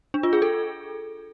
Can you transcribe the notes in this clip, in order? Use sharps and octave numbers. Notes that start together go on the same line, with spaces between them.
D4
F4
G#4
A4